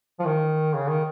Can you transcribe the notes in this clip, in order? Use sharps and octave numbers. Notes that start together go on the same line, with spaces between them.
F3
D#3
C#3
D#3